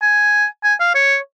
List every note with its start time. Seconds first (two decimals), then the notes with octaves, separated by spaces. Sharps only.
0.02 G#5
0.64 G#5
0.80 F5
0.95 C#5